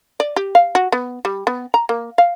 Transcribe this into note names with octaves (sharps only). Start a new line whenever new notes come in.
D5
G4
F5
F#4
B3
G3
B3
A#5
A#3
F5